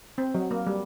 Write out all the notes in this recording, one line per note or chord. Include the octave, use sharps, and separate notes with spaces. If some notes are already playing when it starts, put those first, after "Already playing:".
C4
F#3
A#3
G3